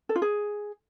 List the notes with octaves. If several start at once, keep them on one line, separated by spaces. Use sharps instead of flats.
A4
F4
G#4